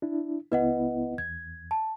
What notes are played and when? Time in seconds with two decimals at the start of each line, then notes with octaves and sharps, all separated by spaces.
0.02 D4 E4
0.52 C#2 B3 E4 B4 D#5 F#5
1.18 E2 G#6
1.71 A5